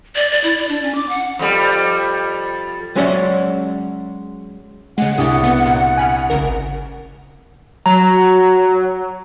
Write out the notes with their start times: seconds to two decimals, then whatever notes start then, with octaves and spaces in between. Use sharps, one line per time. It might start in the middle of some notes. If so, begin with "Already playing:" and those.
0.16 D5
0.32 D5
0.44 E4
0.57 D5
0.69 D4
0.82 C#4
0.95 D6
1.09 F#5
1.39 F2 G3
2.96 F#3 G#3 C#4 D5 E5 F#5
4.98 C#3 G#3 F#5
5.18 C2 D4 G4 G#4 D#6
5.44 B3
5.65 A#2
5.97 G#5 B5 F6
6.30 G#1 C#3 A#4
7.86 F#3 A#5